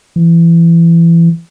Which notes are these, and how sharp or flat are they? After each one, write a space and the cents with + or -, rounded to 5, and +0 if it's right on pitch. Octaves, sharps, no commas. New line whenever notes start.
E3 +25